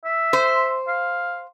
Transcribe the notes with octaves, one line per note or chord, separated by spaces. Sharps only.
E5
C5
F5